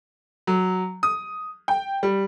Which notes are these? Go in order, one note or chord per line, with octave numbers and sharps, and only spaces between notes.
F#3
D#6
G5
G3